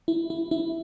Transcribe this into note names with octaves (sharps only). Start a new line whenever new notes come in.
E4
E4
E4